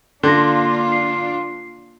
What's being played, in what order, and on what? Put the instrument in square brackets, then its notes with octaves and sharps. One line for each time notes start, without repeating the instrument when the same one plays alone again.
[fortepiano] D3 [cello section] A#3 D4 F4 [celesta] C6 A#6
[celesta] C7